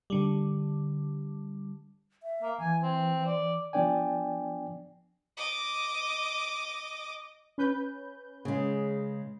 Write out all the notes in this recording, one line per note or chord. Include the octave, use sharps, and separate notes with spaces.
D3 G3
E5
A#3
E3 G#5
C4
D5
F3 B3 D4 D5 G5 G#5
D#5 D6
C#4 B4 G6
C#3 G#3